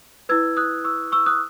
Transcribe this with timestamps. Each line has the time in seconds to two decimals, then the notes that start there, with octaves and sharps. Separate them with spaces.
0.29 E4 B4 E6 G#6
0.57 D#6 F#6
0.84 C#6 E6
1.12 C#6 E6
1.26 D#6 F#6